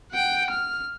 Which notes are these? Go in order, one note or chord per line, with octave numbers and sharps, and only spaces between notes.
F#5 G5
F6